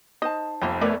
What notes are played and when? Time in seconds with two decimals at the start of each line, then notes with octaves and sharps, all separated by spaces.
0.22 D#4 C5 D#5 A5
0.62 F1 F2 D#3 B3 F4
0.81 A3 B3 A#4 B4 C#5 D5 E5